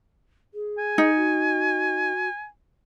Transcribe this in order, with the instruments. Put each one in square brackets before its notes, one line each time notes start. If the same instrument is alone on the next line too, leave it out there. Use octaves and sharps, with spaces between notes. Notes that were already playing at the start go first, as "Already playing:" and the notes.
[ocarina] G#4
[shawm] G#5
[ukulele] D#4
[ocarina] F#4